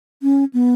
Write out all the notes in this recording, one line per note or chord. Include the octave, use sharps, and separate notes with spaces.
C#4
B3